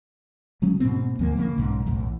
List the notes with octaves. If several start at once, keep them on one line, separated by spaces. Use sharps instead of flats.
C#3 F#3 G#3 C#4
G#2 B2 A#3 C4
D2 F3 G#3 A#3
C#3 F3 G#3 A#3
B1 G#2 C#3
B1 E2 A2